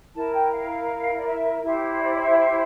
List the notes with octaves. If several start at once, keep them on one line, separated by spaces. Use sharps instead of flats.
E4 A#4 A5
G5
F5
D5
E5
E4 G4 C5 E5
D5
D5
E5
E5